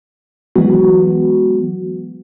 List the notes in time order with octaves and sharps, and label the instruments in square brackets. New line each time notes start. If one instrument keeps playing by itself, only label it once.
[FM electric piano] E3 F#3 G#3 B3 F#4